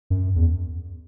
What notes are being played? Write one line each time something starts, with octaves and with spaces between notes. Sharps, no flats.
F#2
E2